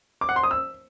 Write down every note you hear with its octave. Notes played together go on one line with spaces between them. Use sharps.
D6
F#5
C6
D#6
E6